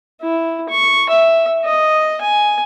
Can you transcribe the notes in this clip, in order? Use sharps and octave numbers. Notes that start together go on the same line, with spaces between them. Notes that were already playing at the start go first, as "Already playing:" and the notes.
E4
C#6
E5
D#5
G#5